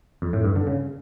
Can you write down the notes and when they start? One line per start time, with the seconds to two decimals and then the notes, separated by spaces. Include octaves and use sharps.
0.22 F2
0.33 A2
0.44 G2
0.56 D3
0.67 C#3